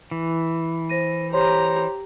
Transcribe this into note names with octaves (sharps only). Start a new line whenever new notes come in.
E3
C5 A#6 D#7
G4 C5 C#5 A#5 C6